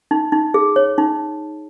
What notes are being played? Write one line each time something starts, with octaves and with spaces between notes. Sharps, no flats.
D#4
D#4
G#4
C#5
D#4